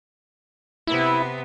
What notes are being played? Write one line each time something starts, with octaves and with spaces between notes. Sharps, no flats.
C3 B3 E4